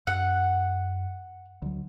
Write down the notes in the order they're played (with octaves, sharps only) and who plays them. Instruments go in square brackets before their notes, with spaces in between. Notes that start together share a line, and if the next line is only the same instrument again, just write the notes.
[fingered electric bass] F#2 [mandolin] F#5
[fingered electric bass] D2 F#3